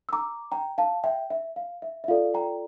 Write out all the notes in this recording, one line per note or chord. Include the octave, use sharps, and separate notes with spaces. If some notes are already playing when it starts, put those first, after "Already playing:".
E6
A#5 D6
G5 A#5
F5 A5
E5 G5
E5
F5
E5
E5
F4 A4 D5 F5
G5 A#5